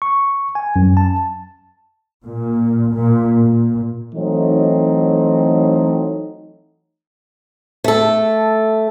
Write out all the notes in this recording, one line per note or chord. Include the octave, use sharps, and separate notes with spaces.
C#6
G#5
F#2
A5
A#2
A#2
A#2
E3 F#3 A3 C4 D#4
A3 A4